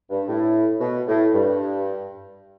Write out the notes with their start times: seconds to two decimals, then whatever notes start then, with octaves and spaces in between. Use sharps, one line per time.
0.10 G2
0.28 A2
0.81 B2
1.08 A2
1.33 G2